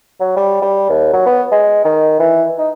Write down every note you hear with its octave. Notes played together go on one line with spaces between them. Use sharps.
F#3
G3
G3
D#2
F#3
B3
G#3
D#3
E3
D#4